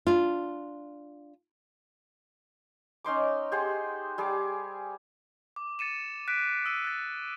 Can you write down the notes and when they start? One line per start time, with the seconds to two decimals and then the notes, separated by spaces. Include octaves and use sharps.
0.07 D4 F4
3.04 C#4 D#4 C6 D6
3.52 G4 G#4 C5 F#5
4.18 G3 G#4 D6
5.56 D6
5.79 A6 C#7 D#7 E7
6.28 F#6 B6 D7
6.65 D#6 E6 D#7
6.84 F#6 A6